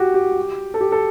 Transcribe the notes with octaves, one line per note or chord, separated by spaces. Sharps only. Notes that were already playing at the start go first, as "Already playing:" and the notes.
Already playing: F#4 G4
G4
A4
G4
A4